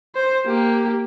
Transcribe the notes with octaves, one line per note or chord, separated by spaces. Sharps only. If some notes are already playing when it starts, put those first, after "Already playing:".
C5
A#3 G4